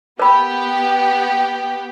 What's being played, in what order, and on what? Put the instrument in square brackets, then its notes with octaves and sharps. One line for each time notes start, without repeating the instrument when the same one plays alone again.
[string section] B3 G4 [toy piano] A#4 B5